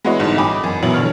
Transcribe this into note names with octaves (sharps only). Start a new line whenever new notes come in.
G#3 E4 F#4 B4 C#5 D#5
G1 G#2
D#5 G5 G#5 B5 D6
F#2
B2 F#3 E4 F#7
D3 C#5 F6